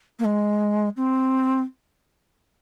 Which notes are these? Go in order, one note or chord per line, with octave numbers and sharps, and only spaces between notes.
A#3
G#3
C4